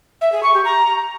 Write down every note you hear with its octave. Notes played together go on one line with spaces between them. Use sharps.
E5
G#4
C#6
G4
A#5